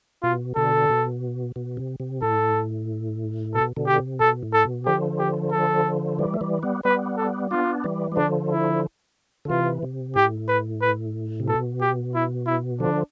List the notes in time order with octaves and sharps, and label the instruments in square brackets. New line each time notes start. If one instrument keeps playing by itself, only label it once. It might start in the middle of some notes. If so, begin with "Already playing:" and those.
[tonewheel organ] B2 [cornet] F4
[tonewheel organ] B2 D3 [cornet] A4
[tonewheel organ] B2
B2
C3
C3
[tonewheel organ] A2 [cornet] A4
[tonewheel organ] B2 [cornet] A4
[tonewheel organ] B2 D3
[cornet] G4
[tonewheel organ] C3
[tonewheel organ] B2 [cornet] A4
[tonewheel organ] A2
[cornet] A4
[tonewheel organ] B2
[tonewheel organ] D3 F3 [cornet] G4
[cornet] G4
A4
[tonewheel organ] E3 G3
A3
E3 G3
G3 B3
[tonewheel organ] G3 B3 [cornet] B4
[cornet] A4
[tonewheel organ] B3 D4 [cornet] F4
[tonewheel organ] E3 G3
G3
[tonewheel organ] D3 F3 [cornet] D4
[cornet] E4
[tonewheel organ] D3
[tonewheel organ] C3 E3 [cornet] F4
[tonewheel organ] C3
[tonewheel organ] A2 [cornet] G4
[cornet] B4
B4
[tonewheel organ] C3
[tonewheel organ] B2 [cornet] A4
[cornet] G4
E4
E4
[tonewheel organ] D3 F3 [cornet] D4